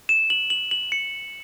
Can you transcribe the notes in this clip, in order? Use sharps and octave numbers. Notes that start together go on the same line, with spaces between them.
E7
F#7
F#7
F#7
C#7